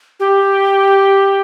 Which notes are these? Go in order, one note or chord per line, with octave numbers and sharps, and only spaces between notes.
G4